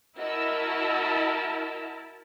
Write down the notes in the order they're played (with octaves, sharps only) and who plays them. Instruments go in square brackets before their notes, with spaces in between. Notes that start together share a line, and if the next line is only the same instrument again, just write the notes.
[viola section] E4 A#4 A5 [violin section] F#4 D#5 E6